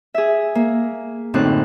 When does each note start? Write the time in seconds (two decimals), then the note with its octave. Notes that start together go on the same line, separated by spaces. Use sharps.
0.14 G#4 E5
0.55 A#3
1.34 F#2 A2 D3 C4 D#4 F#6